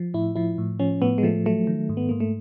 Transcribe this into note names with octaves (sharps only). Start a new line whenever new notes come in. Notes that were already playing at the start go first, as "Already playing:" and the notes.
Already playing: F3
A2 E4
F3 E4
A2
F3 C#4
A2 B3
G#3
F3 A3
F#3 A3
D#3
G#2
B3
G#2 A#3
A3